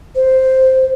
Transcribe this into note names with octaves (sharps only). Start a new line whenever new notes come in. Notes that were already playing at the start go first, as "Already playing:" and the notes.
C5